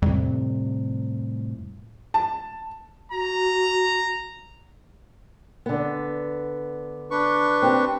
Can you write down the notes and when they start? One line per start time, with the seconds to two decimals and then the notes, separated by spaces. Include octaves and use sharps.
0.02 F2 A2 C3 G3
2.14 A5
3.12 F#4 A#5
5.66 D3 B3
7.11 D4 B4 C#6
7.62 C4 G4